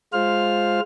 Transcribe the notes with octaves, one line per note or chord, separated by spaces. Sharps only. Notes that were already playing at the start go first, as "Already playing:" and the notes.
G#3 F4 C5 F5 F6